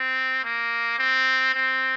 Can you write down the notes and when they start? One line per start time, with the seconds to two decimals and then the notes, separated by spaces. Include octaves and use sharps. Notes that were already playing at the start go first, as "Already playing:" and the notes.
Already playing: C4
0.44 A#3
0.99 C4
1.54 C4